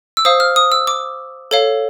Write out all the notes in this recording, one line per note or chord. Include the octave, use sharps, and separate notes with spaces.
E6
C5 F5 D#6
F6
D#6
E6
D6
A4 C#5 F5